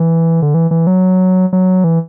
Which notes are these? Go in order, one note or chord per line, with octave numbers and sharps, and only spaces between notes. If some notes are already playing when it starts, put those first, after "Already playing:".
Already playing: E3
D3
E3
E3
F#3
F#3
E3